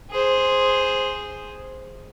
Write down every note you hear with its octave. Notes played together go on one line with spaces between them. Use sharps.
G#4 C5